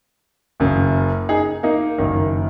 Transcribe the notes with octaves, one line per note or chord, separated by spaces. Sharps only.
F#1 F#2 C#3
D#4 G#4
A#3 D#4
F#1 F#2 D#3